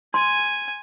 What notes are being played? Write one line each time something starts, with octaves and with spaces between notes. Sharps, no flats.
G#5 C6